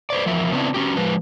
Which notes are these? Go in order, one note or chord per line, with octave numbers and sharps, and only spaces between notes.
B4 C5 D5
E2 F3 A#4 E5
C#3 B3 C4 D4 E4
C#4 F#4 G4
F3 G#3 B4